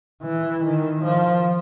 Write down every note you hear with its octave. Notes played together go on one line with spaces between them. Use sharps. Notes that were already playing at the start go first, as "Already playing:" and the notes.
E3
D#3
F3